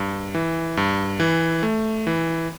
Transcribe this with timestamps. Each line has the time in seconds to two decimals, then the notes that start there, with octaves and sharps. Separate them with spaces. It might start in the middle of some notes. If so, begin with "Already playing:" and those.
Already playing: G2
0.34 E3
0.77 G2
1.20 E3
1.63 A3
2.07 E3